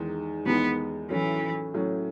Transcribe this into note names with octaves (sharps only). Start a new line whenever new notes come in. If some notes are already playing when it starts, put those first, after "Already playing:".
Already playing: E2 D#3 G#3 D#4
E2 D#3 G#3 B3 D#4
A2 E3 F#3 A3 C#4
A2 F#3 A3 C#4